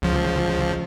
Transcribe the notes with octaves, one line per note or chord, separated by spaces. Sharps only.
C#2 F3